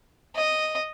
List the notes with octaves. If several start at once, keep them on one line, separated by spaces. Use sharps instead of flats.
D#5